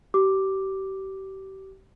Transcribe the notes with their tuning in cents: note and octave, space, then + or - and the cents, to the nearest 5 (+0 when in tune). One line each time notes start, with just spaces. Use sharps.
G4 -35 D6 +0